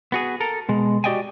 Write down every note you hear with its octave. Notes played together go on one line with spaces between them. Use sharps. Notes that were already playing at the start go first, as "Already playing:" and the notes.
B3 F#4 G#4
A4 A#4
B2 G#3
F#4 G4 D5 D#5 G5 G#5